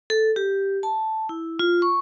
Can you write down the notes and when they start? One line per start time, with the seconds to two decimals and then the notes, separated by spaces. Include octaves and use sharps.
0.10 A4
0.36 G4
0.83 A5
1.29 E4
1.59 F4
1.82 C#6